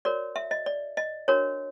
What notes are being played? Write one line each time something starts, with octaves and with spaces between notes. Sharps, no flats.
F#4 A#4 C#5 D5
E5
D#5
D5
D#5
D4 F#4 A#4 C#5